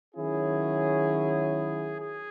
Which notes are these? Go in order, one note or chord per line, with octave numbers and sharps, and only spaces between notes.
D#3 F#3 C#4 E4 G#4
G#4